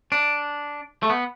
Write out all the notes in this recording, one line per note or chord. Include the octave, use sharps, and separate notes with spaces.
D4
A3
B3